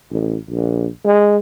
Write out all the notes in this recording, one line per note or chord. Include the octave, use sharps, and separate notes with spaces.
A1
A#1
G#3